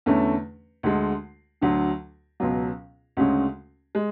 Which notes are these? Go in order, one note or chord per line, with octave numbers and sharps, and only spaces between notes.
E2 D3 A3 C#4
D2 D3 G#3
D2 D3 F#3
C#2 B2 F#3
D2 C#3 G#3 C#4
G#3